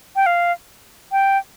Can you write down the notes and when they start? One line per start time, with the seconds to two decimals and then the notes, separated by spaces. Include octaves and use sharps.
0.16 G5
0.26 F5
1.12 G5